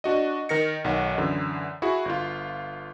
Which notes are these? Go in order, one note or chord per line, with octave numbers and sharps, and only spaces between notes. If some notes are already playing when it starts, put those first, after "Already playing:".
D4 F#4 D#5
D#3 A#4 A#6 C#7
B1 D#3 F#5
F#2 D3 E3
E4 F#4 G#4
G1 F4